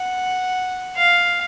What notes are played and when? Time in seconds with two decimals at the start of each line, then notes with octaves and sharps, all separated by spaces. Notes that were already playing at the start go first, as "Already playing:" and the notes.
Already playing: F#5
0.96 F5